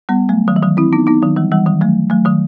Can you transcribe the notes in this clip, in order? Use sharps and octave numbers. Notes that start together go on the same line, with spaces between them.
G3 B3
F#3 A3
D#3 F#3
E3
D#3 F#3
C4 E4
B3 D#4
B3 D#4
D#3 F#3
E3 G3
E3 G3
D#3 F#3
F#3 A3
F#3 A3
D#3 F#3